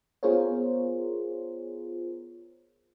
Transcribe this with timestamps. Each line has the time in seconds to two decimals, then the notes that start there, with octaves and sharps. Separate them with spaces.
0.23 B3 F4 G#4 A#4 C5 C#5